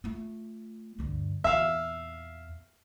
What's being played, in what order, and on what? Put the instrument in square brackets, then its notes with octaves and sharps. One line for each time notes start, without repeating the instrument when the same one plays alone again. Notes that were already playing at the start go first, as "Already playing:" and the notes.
[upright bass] A3 F4
D2 G2
[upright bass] E2 A#2 [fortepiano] E5 F5